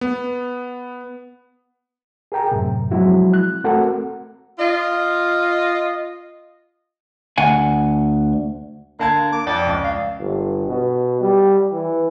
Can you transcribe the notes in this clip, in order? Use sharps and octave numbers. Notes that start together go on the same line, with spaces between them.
B3
G#4 A#4 G5 A#5
F#2 A2 C3
F3 F#3 G#3 C4 E4 F#4
F#6
A3 C4 F#4 A4 A#4 F#5
F4 D#5
D2 F#5 G#5
D3 A#3 A5 G#6
D6
F2 D5
C#2
F5
G1
B2
G3
E3